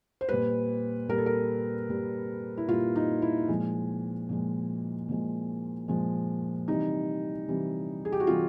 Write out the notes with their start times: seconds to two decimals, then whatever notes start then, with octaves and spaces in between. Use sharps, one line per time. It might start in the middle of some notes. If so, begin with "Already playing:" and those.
0.21 C5
0.29 A#2 G3 B4
1.08 A#2 G3 A#4
1.18 A4
1.26 A#4
1.89 A#2 G3
2.57 E4
2.68 A#2 G3 F4
2.96 D#4
3.22 E4
3.48 A#2 F3 G#3
4.29 A#2 F3 G#3
5.09 A#2 F3 G#3
5.88 A#2 F3 G#3
6.68 C3 E3 G3 D#4
7.48 C3 E3 G3
8.05 G#4
8.12 G4
8.20 F#4
8.27 C3 E3 G3 F4